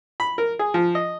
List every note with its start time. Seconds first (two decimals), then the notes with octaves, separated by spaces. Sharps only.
0.20 B5
0.38 A#4
0.59 G#4
0.74 F3
0.95 D#5